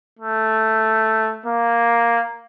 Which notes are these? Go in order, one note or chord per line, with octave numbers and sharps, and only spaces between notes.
A3
A#3